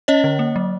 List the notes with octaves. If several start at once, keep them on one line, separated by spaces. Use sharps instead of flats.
C#4 C#5 D#5
D3
A#3
F#3